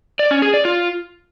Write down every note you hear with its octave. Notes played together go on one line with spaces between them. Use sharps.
D5
C#4
G#4
D5
F4